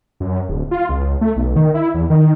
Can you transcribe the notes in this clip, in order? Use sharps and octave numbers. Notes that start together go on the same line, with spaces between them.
F#2
D1
F4
C#2
A3
B1
D#3
E4
E2
D#3